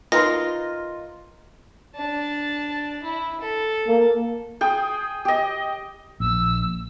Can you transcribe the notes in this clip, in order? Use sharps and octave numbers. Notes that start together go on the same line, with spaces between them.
D#4 F4 A#4 B4 A#5 C6 A#6
D4 A5
E4
A4
A#3
G#4 G5 D#6
G4 D#5
A#1 E6